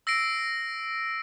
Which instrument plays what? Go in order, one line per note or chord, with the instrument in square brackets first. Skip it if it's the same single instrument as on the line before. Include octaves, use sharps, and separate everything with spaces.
[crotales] E6 A#6 C7 D7